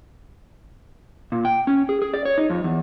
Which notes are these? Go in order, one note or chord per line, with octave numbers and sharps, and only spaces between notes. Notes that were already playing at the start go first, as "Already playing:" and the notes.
A#2
G5
C#4
G#4
G#4
D5
C#5
D#4
F2
E2